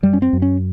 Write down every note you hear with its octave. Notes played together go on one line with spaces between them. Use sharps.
F#2 G3
C#4
C4
F#2
C#4